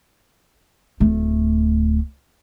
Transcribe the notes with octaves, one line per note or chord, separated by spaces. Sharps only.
D1 A3